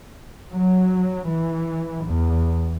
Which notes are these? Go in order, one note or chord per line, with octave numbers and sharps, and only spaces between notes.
F#3
E3
E2